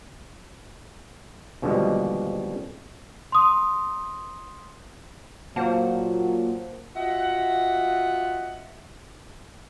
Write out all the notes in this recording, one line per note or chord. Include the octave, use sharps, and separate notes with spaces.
D#2 B2 D3 F3 G3 G#3
C6 D#6
A#2 F#3 A#3 C5 F#5 A5
F4 F#4 D#5 E5 F#5